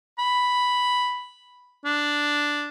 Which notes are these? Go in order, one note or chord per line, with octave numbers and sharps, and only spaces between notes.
B5
D4